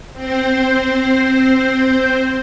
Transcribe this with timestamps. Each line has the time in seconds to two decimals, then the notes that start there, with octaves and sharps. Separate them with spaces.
0.13 C4 C5